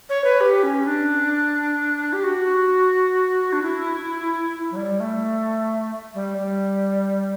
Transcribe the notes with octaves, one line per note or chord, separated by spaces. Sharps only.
C#5
B4
G4
C#4
D4
G4
F#4
D4
E4
F#3
G3
A3
G3
G3